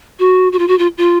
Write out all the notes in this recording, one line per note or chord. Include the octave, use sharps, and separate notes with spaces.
F#4
F#4
F4
F#4
F4
F4